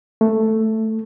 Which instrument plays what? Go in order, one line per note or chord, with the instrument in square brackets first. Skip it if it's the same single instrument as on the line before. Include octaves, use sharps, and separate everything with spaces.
[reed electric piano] A3